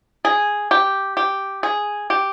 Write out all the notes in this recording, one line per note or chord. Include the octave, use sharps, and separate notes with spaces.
G#4
G4
G4
G#4
G4